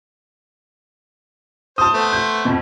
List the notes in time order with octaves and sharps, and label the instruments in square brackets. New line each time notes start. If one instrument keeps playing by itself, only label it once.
[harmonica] C5 [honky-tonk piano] A5 D#6
[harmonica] A3 B3 C5
[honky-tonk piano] G6
F2 B2